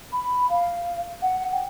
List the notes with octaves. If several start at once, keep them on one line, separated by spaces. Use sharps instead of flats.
B5
F5
F#5
G5